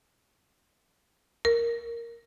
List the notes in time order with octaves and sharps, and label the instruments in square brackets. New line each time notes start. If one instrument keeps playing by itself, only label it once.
[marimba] A#4